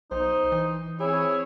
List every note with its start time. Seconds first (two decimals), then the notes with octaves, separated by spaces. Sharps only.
0.11 B1 D#4 C5
0.52 E3
1.00 C4 E4 G#4 C#5